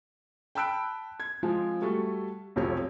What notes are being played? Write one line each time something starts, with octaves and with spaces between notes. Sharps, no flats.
G5 A5 B5 E6 F#6 D7
G#6
F3 G#3 C4 F4
G3 A3 F#4 A4
F1 B1 F3 F#3 G4 C#5